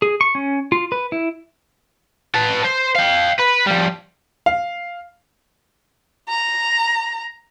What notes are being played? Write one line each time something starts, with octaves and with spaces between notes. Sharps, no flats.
G#4
C#6
C#4
F4
B4
E4
B4 A5
C5
F5 G5
B4
F3 G3
F5
A#5